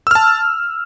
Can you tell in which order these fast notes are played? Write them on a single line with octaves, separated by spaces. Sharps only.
E6 F6 A5